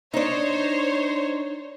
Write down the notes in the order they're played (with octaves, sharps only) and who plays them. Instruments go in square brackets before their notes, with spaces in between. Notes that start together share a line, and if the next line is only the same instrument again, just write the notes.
[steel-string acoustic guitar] D4 D#4 [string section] C5 C#5